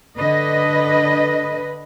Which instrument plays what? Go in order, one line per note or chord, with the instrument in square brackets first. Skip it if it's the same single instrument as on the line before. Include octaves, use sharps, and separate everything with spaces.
[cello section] D3 B4 D#5